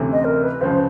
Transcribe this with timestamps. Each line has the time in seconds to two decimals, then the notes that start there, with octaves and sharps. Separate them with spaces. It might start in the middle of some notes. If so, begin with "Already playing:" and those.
Already playing: D2 C3 E3 A3 C#4
0.12 D#5
0.25 A#4
0.43 B4
0.61 C#2 C#3 F3 C5